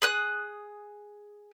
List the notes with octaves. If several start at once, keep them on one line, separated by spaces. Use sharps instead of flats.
G#4 D#6 F#6